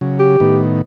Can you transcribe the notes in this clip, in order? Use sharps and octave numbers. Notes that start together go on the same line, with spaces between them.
C#3 F#3
G4
A2 D#3 B3